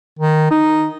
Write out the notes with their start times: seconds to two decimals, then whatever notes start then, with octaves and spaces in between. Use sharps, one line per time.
0.19 D#3
0.51 D#4